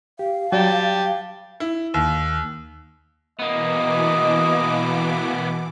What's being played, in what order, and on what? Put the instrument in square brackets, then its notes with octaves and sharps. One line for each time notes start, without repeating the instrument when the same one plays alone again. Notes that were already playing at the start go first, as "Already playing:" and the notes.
[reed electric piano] G4 [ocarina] F5
[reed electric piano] F#3 A6 [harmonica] G4 A5 [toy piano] D5 G5
[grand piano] E4
D#2
[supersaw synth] B2 E3 D6 [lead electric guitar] A#3 B3 [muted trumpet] D#5